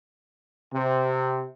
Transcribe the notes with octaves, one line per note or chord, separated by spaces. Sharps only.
C3